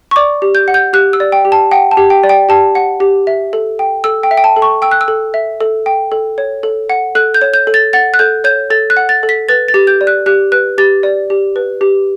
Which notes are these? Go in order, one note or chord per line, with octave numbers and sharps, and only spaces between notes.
C#6
D5 D6
G4
G6
F#5
G6
G4 F#6
E6
D5
G5
G4
A5
F#5 G5
A5
G4
G5
D5
G5
G4 A5
F#5
G4
E5
A4
G5
A4 E6
G5
E5
G5
A5
A4
C#6
G5 E6
F#6
E6
A4
E5
A4
G5
A4
C#5
A4
F#5
A4 F#6
G6
C#5
G6
A4
A6
F#5 A6
F#6
A4 G6
C#5 G6
A4 A6
F#6
F#5
A6
A4
B6
B4 A6
A6
G4
G6
D5
F#6
G4 F#6
B4 F#6
G4 A6
D5
G4
B4
G4